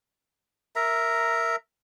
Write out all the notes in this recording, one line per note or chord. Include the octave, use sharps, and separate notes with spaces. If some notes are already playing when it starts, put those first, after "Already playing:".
A#4 E5 A#5